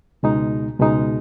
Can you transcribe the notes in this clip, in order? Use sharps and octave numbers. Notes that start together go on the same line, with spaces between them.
C#2 B2 G#3 D#4
C#2 B2 G#3 D#4